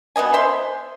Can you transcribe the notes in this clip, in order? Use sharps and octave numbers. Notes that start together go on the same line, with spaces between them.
B2 B3 D#5 G#5
C5 E5 C6